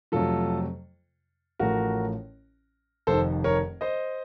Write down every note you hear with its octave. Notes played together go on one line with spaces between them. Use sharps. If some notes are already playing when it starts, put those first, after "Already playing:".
F2 C3 F#3 A3 F4 A4
A1 A2 F3 A3 F#4 A#4
F1 F2 D#3 A4 C5
A#4 C#5
C5 D#5